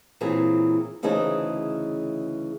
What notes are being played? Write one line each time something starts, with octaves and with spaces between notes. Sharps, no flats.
A#2 E3 F#3 C4 G#4
D2 C#3 E3 D#4 G#4 C5